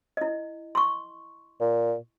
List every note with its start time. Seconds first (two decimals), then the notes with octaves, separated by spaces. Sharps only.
0.17 E4 D#5
0.75 C6 C#6
1.61 A#2